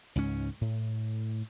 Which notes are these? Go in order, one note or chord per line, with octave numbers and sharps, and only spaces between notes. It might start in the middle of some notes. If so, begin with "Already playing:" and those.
C#2 G#2 C#4
A2